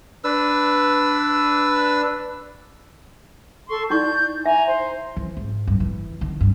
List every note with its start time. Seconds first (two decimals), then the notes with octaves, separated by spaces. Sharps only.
0.24 D4 B4 E6
3.69 A4 C6 C#6
3.90 D#4 E4 D5 C#6 G6
4.46 E5 G#5 A#5
4.67 C5
5.16 E3
5.37 G#2
5.67 G2
5.80 E3
6.21 D#3
6.41 G2